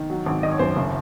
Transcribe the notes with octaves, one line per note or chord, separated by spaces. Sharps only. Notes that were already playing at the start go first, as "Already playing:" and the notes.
Already playing: D#3
F#3
G#1
D#3 D#5
C#5
F#2 C5
C#5
F#1